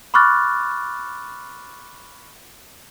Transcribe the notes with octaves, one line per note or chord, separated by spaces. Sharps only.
B5 C#6 D6 F6 F#6 A6